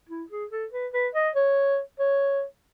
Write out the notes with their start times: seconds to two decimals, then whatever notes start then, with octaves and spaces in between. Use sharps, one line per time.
0.09 E4
0.30 G#4
0.51 A4
0.72 B4
0.93 B4
1.15 D#5
1.35 C#5
1.99 C#5